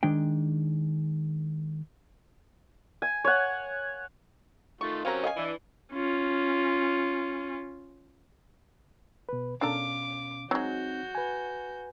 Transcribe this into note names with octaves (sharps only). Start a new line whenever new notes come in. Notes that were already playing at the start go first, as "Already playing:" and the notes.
D#3 G#3 D4 G5
G#5
C#5 F#5
D#3 A3 F4 C#6
F#3 C4 C#4 G4 A#4 F5 A#5
D#5 F5 G#5
E3 D4
C#4 F4
B2 B4
B2 C#4 D4 A4 A#4 F5 D6
F#3 G#3 C4 D#4 F#4 G6
B4 G#5